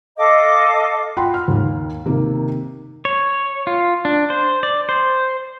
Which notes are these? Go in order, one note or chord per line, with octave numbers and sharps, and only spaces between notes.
A4 D#5 F5 D6
F4 F#5 G5 B5 C6
F6
D#2 D#3
C3 D#3 A#3
C#5
F4
D4
C5
D5
C5